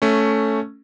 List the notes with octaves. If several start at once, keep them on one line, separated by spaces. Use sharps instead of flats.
A3 C#4